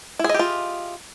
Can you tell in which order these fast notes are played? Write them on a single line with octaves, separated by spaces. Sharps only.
E4 G#4 D#5 G4 F4